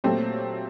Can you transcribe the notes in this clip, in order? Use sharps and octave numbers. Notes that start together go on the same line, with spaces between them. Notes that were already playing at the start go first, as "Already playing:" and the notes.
A#2 F#3 A3 C4 G4